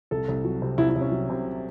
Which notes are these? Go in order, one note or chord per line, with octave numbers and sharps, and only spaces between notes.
C2 A4
C2
F#3
C3
C2 E4
E4
C2
C#4
F#3
C3